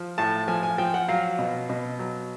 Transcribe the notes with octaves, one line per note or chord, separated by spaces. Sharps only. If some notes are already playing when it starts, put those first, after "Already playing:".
Already playing: F3
A2 A5
F3 G#5
G#5
F3 G5
F#5
F#3 F5
B2
B2
F#3